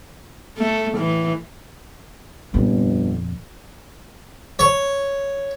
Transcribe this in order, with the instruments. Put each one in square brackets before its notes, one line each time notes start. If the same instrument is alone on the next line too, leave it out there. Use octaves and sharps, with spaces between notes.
[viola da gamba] A3
A2 E3
[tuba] G1 [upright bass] F2 A#2
[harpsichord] C#5